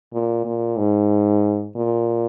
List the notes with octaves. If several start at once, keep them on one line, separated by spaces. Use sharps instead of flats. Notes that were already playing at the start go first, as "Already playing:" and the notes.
A#2
A#2
G#2
A#2